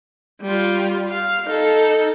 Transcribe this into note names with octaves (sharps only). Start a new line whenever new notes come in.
G3 F4
F5
D#4 A4